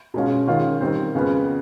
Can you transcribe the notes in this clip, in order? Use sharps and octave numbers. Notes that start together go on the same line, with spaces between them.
B2 G#3 C#4 F4
D#3 G#3 C#4 F4
D#3 G3 C4
F2 C#3 F3 G#3 B3